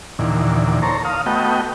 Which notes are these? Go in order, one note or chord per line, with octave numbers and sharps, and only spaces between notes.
D#2 A#2 D3 E3
A4 A#4 C5 C#5 A#5
F5 D#6
A3 B3 F#4 D#5 G5